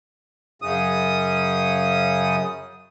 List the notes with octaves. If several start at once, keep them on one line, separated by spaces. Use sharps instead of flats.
F#2 C#3 D#6